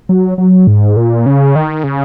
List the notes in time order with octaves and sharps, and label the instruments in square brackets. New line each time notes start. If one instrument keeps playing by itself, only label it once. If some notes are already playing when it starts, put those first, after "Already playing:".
[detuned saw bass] F#3
F#3
G#2
A#2
C#3
D#3
C#3